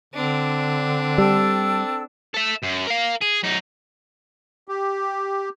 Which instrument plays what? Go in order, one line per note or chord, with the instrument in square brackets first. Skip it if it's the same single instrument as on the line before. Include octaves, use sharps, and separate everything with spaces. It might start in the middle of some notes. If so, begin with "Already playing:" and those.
[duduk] D3 [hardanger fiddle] C4 D4
[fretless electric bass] G3 [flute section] A4 G5 E6
[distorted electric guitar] A4 E5
F#2
A#4 F5
G#4
F#2 D#4
[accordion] G4